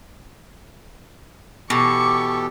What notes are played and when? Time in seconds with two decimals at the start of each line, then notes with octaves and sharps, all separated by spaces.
1.70 B2 E3 G4 A4 C#6 D6